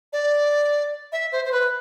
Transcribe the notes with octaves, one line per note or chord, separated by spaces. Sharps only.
D5
E5
C5
C5
B4